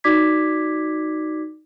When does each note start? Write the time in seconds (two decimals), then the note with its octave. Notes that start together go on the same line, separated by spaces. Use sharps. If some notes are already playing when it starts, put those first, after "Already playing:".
0.04 D#4 F#4 D5 D6 G#6 B6